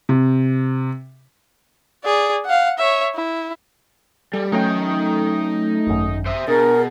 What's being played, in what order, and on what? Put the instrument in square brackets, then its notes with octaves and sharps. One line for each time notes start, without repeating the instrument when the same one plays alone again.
[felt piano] C3
[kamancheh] G#4 D5
F5 F#5
C#5 E5
E4
[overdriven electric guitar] G3 [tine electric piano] A4
[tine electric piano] F#3 C#4 [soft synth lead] A3 [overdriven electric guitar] D#4 G5
[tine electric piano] G#1 F#2
[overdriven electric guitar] C5 E5 [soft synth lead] D#6
[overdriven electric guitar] B2 [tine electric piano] D4 [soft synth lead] G#4 [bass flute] A#4